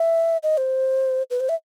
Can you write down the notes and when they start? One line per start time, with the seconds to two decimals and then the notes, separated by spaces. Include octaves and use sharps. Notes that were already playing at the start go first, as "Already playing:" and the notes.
Already playing: E5
0.43 D#5
0.57 C5
1.31 B4
1.40 C5
1.49 E5